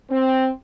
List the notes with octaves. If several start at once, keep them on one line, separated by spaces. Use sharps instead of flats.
C4